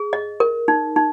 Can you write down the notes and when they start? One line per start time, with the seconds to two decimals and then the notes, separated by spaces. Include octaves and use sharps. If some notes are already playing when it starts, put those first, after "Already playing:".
Already playing: G#4
0.13 D#5
0.40 A#4
0.68 D#4
0.96 D#4